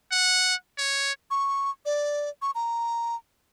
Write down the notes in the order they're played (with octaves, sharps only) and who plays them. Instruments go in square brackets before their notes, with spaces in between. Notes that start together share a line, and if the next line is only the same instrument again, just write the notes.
[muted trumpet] F#5
C#5
[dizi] C#6
D5
C#6
A#5